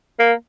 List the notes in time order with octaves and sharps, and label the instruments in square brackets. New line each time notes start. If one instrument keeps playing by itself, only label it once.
[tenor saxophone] A#3